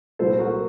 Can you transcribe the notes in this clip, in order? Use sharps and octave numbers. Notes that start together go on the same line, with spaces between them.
C2 A#2 F#3 A4 C5
F#4 A#4